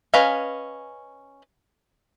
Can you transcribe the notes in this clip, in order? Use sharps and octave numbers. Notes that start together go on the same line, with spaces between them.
C#4 B4 D#5 F5 G#5